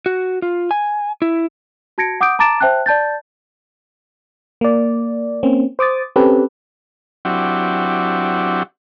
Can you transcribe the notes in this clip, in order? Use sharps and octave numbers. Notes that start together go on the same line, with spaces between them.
F#4
F4
G#5
E4
F#4 A5 G#6 A#6 C#7 D7
F#5 D6 D#6 G6 D7
A5 A#5 D6 A6 D7 E7
C5 E5 G5 A5 F#6
D5 A5 G6 A6
A#3 D5
A#3 C4 C#4
C5 D6 D#6 A6
C4 C#4 G4 A4 B4
F#3 C4 D4 E4 F#4 G4